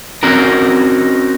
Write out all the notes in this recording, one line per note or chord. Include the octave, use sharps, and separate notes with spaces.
C4 C#4 D#4 F#4 A#4